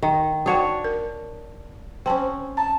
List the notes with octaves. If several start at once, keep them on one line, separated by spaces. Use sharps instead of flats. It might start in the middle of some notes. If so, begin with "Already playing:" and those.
D#3
D4 F#4 C#5 F#5 G5
A#4
C4 C#4 G5 A5
A5 A#5